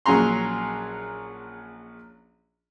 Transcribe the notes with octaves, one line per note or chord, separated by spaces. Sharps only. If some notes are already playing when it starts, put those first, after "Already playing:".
A#1 F#3 C#4 G#4 A#5 C6